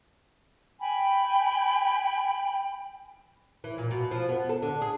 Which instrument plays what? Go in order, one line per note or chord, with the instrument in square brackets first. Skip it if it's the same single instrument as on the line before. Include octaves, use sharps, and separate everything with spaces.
[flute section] G5 G#5 B5
[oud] E3
A#2
B2
F3
B3
A4
D3
G#4